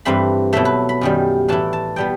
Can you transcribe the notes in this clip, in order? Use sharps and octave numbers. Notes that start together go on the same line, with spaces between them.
G2 E3 A3 C4 B5
B2 F#3 A3 E5
B4
B5
F#2 D#3 G3
A2 E3 A3 E4 A5
A5
B2 G3 B3 G5